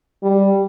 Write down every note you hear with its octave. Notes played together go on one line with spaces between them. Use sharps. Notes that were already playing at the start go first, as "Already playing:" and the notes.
G3